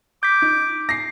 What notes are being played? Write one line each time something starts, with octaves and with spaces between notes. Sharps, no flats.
D6 G6 B6
D#4
A#6 C7